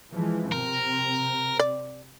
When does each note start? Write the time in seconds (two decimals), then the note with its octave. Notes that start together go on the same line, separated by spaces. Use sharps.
0.13 E3 F3 G#3
0.52 C3 C4 A#4
1.59 D5